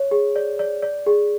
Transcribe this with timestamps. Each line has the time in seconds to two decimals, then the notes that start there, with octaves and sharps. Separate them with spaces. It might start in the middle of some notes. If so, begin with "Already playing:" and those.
Already playing: C#5
0.11 G#4
0.36 D5
0.59 D5
0.82 D5
1.06 G#4